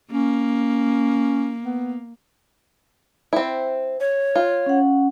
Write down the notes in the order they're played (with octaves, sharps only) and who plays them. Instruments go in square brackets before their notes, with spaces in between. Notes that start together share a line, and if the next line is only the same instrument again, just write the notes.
[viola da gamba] A#3 [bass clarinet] C#4
[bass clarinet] B3
[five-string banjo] C4 E4
[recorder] C#5
[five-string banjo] F4
[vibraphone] C#4 F#5